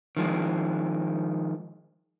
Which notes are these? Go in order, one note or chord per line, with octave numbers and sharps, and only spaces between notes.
D#3 F3 G#3